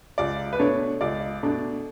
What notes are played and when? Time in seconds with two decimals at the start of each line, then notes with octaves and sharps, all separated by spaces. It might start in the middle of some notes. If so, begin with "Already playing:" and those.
0.18 C#2 D5
0.53 B4
0.59 B2 A3 D4 C#5
1.01 C#2 D5
1.43 B2 A3 D4